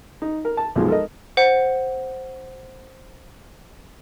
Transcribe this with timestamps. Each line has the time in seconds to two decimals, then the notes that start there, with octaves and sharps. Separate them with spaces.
0.22 D#4
0.45 A#4
0.57 A5
0.75 B1 B2 F3 G#3
0.88 A4 A#4 D#5
1.37 C5 F#5